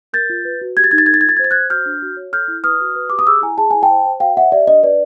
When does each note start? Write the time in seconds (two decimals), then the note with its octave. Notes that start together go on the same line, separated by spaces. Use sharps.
0.13 A#4 G6 A6
0.30 F4
0.45 B4
0.61 F#4
0.77 G4 G#6
0.84 A6
0.91 D#4 G#6
0.98 A6
1.06 A4 G#6
1.14 A6
1.21 G#6
1.24 F4
1.29 A6
1.37 G#6
1.39 C5 A6
1.51 C5 F#6 G#6
1.70 F#4 F6 G6
1.86 D4
2.02 F#4
2.17 C#5
2.33 A4 F6 G6
2.48 E4
2.64 B4 D#6 F6
2.80 F#4
2.96 B4
3.10 G4 D6
3.19 D#6
3.27 G#4 D6 E6
3.42 E4 G#5 A#5
3.58 G#4 A5
3.71 E4 G#5
3.82 G5 A5
3.90 C5
4.06 C5
4.20 F#4 F5 G5
4.36 C#5 E5 F#5
4.52 G4 D5 E5
4.67 D4 D#5
4.83 B4 D5